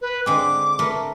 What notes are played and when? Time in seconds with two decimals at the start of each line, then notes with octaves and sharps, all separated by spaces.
0.01 B4
0.26 D3 G#3 C4 D6
0.79 A3 A#4 B4